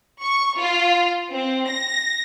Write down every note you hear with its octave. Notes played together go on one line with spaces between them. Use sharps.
C#6
F4
C4
A#6